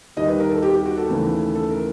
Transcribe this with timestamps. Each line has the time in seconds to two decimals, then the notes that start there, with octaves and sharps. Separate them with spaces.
0.17 D#2 D#3 G3 D#5
0.28 B4
0.40 A#4
0.51 A4
0.62 G4
0.74 G4
0.86 F#4
0.97 A4
1.09 D#2 C#3 E3 A3
1.55 A4
1.70 A#4